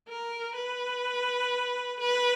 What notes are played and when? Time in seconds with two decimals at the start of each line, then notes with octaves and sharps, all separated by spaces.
0.08 A#4
0.55 B4
2.00 B4